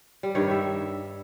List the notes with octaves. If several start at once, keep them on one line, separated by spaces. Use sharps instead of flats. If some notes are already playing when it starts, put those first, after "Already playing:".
G3
G2 D#3 C#5
E5